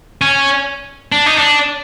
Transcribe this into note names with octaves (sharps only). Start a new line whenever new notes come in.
C#4
D4
D#4
D4